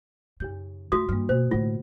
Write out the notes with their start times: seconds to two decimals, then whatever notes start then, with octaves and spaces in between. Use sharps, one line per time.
0.40 F#2 C#3 G4 G6
0.92 C#3 A3 F4 F#4 D#6
1.09 G2 D#3 A#3 F6
1.29 B2 A#3 F#4 C5
1.51 A2 D3 A3 A#3 F4